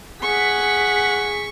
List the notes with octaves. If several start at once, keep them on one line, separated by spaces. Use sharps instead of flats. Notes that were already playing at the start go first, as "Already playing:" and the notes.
G#4 F#5 C#6 B6